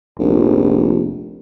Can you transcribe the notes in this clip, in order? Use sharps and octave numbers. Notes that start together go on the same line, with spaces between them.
F1 A#1